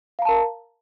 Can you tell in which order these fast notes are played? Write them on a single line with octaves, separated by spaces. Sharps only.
F5 A#5 A5 A#4